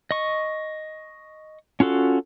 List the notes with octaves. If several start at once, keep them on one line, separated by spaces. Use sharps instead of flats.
D#5 C#6
C#4 F4 F#4 A4